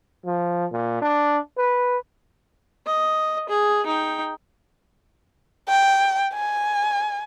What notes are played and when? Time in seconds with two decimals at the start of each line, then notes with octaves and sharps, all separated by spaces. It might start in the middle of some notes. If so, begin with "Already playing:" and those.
0.25 F3
0.72 A#2
1.02 D4
1.57 B4
2.86 D#5
3.49 G#4
3.85 D#4 G5
5.69 G5
6.33 G#5